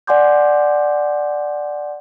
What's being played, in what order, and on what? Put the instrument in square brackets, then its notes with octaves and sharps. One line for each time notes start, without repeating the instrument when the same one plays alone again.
[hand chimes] D5 F#5 G#5 C6 D6 G6